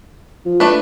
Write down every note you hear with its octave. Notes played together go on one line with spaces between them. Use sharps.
F3
A3 D4 B4